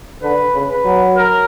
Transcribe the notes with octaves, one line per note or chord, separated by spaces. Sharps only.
D3 B4
C#3
B4
F#3
A#4